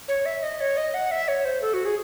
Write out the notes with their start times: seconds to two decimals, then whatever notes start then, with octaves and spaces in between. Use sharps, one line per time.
0.08 C#5
0.26 E5
0.43 D#5
0.61 C#5
0.77 D#5
0.94 F#5
1.11 E5
1.28 C#5
1.45 C5
1.62 A4
1.74 F#4
1.85 G#4